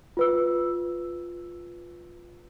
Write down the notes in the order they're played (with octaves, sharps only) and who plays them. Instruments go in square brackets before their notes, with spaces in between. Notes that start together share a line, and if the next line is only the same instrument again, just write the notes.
[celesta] F4 B4 E6